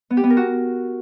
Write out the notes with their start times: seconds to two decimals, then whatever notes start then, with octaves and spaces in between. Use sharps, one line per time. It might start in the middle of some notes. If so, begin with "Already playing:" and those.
0.10 B3
0.17 G4
0.24 B3
0.30 A#4
0.37 F#4